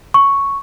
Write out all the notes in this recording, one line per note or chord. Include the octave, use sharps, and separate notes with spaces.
C#6